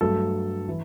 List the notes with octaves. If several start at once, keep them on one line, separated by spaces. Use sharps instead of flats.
G2 F#3 A3 A4
E3